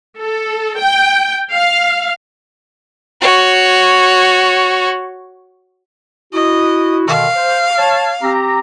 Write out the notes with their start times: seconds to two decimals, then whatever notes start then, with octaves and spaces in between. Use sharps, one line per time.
0.20 A4
0.78 G5
1.53 F5
3.21 F#4 C#5
6.33 E4 F#4 D#5
7.08 B2 D3 D#3 F5
7.36 C5
7.79 C#5 A5
8.22 C4 G4 A#5